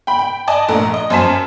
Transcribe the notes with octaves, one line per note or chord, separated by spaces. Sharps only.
G5 B5
G5
D5 D#5 G#5 A5
A#1 A3 A#5
D#5
F#2 C5 G#5 A5 B6 E7